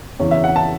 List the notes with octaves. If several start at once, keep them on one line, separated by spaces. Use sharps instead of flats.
E2 C#3 E3 C#4
E5
F#5
A5